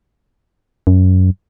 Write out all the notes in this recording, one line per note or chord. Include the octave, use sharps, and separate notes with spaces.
F#2